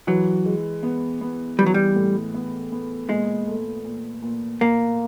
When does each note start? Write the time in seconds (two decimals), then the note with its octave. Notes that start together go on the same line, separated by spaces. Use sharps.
0.07 E3 F#3
0.45 G#3
0.83 B3
1.21 B3
1.59 E3 G3
1.66 F#3
1.74 G3
1.96 A2
2.34 B3
2.72 B3
3.09 A#2 G#3
3.47 A3
3.85 A#2
4.22 A#2
4.61 A#2 A#3